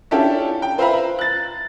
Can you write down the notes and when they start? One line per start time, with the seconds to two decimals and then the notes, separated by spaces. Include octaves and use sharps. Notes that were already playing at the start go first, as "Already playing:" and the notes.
0.11 C#4 D4 E4 F4 G4 A4
0.62 G5
0.78 B4 C5 E5 F5 A#5 B5
1.19 F#6 A6